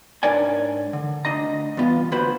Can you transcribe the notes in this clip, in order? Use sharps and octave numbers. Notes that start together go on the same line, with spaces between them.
G#2 D4 A#4 C#5 D5 G#5
D3
D2 D4 D#5 A#5
E2 G2 B3 F4
D2 A#3 F#4 B4 C5 B5